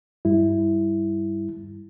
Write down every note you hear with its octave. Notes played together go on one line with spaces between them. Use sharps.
G2 G3 E4